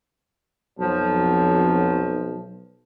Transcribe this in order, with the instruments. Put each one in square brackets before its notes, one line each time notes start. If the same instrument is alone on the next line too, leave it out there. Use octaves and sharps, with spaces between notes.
[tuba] B1 [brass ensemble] F2 F#3 [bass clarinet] F3